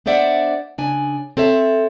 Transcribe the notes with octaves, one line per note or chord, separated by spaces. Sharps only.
B3 D4 C5 D5 E5 F#5
C#3 D4 G#5
C4 A4 C#5 E5